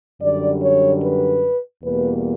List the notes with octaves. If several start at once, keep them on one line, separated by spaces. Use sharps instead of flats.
F#2 D3 G3 D5
C#5
B4
E2 B2 G3 A#3 B4